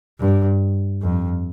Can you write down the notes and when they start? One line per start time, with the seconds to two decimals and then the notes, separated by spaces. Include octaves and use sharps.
0.20 G2
1.02 F2